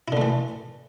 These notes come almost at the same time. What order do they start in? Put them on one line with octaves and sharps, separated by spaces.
E4 D3 A3 E3